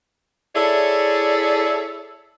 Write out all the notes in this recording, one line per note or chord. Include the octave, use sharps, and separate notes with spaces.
E4 G#4 A4 C#5 D5